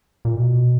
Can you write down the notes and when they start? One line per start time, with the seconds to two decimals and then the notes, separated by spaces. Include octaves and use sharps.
0.25 A#2
0.36 B2